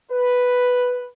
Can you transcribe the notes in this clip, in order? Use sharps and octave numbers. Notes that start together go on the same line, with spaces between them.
B4